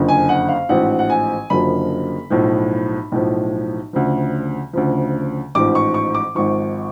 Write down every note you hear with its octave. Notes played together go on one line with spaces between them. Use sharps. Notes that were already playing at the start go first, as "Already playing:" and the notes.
Already playing: F#1 F2 D3 F3
G#5
F#5
F5
A1 G#2 F3 F#5
F#5
G#5
F#1 F#2 D3 F3 B5
B1 A2 F3
B1 A2 F3
D2 C#3 F3
D2 C#3 F3
A1 G#2 F3 D6
C#6
C#6
D6
G#1 G#2 F3 C#6